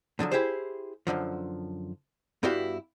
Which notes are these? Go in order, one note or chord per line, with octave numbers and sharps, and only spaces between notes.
A2 D3 F3 F#3
E4 G4 G#4 C5
F#2 A2 D3 F3
G2 B3 E4 F#4 G4 F5